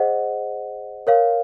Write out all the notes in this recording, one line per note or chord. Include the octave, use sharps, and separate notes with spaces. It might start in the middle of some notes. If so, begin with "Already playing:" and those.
Already playing: G#4 C5 D#5 F#5
A#4 C#5 F5